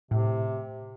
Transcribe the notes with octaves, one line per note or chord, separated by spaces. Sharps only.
A2 C3